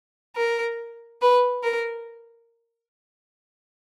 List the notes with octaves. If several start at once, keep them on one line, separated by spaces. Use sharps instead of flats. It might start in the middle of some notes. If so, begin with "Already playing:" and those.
A#4
B4
A#4